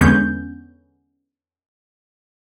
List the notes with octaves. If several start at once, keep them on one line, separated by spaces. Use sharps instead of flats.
E2 D3 G#3 B3 C#4 G6